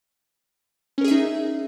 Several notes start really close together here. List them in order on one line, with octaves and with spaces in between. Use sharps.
C#4 A#4 G#4 E5 D#4